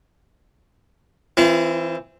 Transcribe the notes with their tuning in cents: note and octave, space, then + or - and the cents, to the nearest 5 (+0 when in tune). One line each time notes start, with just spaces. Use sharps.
E3 -5 C4 +0 F4 -40